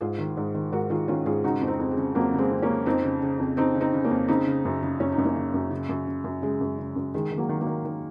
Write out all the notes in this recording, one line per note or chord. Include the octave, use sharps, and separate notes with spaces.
G#2 F4 G#4
D#3
G#2
D#3
G#2 F#4 A#4
D#3 F4 G#4
D#3 C#4 F4
G#2 F4 G#4
C#3 D#4 F#4
F2
C4 D#4
F2
G#3
C#3
F2 F#3 A#3
C#3
G#3 C4
F2
A#3 C#4
C#3
F2 C4 D#4
C#3
C#3
F2
C#3 C4 D#4
C#3
C4 D#4
C#3
A#3 C#4
F2
C#3 C4 D#4
C#3
F#2
C#3
F#2 C#4
D#4
F#2
A#3 C#4
C#3
F#2
C#3
F#2
C#3
F#2
C#3 G#3
F#2
C#3
F#2
D#3 G#3
D#3
F#3 A#3
D#3
F#3 A#3
D#3
D#3